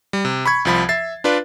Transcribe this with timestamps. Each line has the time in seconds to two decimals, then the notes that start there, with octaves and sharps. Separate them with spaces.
0.13 G3
0.25 C3
0.46 B5 C#6 G#6
0.65 C2 F3 B5
0.89 E5 A6 C7
1.24 D4 F4 B4 D5